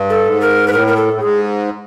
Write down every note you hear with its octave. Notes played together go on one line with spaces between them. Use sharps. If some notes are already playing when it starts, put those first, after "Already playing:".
Already playing: G2
A4
G#2
A#4
B4
A2 A#4
A#4
A4
A2
G#2 G#4